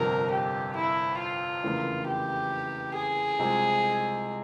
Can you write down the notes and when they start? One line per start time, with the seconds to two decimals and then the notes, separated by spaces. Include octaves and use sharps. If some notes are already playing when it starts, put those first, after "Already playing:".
Already playing: G1 F2 C3 A#4
0.31 G4
0.76 E4
1.19 F4
1.63 F1 E2 C#3 E3 A#3
2.08 G4
2.95 G#4
3.39 C2 C3 F3 G#3